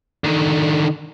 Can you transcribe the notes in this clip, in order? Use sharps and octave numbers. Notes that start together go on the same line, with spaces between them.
D3 D#3